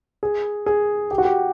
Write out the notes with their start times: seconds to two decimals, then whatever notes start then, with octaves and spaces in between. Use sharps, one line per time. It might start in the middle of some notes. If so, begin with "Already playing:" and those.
0.23 G#4
0.66 G#4
1.11 G4
1.18 F#4
1.25 G4